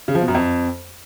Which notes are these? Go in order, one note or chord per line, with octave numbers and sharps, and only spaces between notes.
C#3
F3
B2
F#2
F2